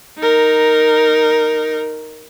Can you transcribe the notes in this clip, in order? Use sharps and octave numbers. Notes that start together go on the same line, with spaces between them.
D#4 A#4